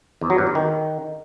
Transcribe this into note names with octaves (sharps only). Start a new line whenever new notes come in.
E2
F#3
G2
E2
D#3